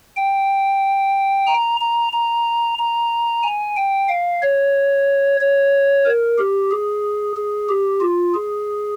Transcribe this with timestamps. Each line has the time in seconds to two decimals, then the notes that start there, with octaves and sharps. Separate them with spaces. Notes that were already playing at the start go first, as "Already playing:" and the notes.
0.16 G5
1.47 A#5
1.80 A#5
2.12 A#5
2.78 A#5
3.43 G#5
3.76 G5
4.09 F5
4.42 C#5
5.40 C#5
6.05 A#4
6.38 G4
6.71 G#4
7.37 G#4
7.69 G4
8.01 F4
8.34 G#4